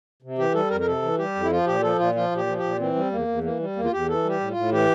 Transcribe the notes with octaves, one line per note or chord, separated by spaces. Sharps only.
C3
E3 G4
G3 A4
F2 A#4
A#4
C3 A4
E3
G3 G4
F2
E4
F3 F4
A#2 G4
F3 A4
A#2 F4
F3 F4
A#2 G4
F3
G4
A#2
E3 C4
G3
E2 A#3
E2
E3 A#3
G3
E2 A#3
F4
E2 G4
E3 A4
G3
G4
A2
F4
A2
E3 G4